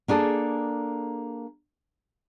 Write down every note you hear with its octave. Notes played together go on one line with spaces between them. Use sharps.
A#3 D4 G#4 A4